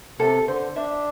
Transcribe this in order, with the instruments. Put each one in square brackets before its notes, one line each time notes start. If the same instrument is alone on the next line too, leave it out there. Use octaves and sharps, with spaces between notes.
[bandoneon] C3 [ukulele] A4
[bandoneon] D3 [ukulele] C5
[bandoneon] D4 [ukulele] E5